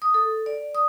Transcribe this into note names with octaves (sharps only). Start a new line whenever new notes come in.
D#6
A4
D5
D#6